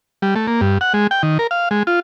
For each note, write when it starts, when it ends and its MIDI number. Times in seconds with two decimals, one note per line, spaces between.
0.22 0.35 55
0.36 0.47 57
0.47 0.61 58
0.61 0.78 43
0.81 0.93 78
0.94 1.07 56
1.11 1.22 79
1.23 1.38 51
1.39 1.47 70
1.51 1.69 77
1.71 1.83 56
1.87 2.00 65